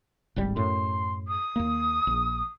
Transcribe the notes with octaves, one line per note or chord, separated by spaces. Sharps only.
D1 G#1 G3
F#2 A2 C6
D#6
D#2 A#3
A#1